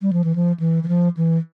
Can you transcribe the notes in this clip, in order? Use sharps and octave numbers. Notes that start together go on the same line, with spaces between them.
G3
F3
E3
F3
E3
E3
F3
E3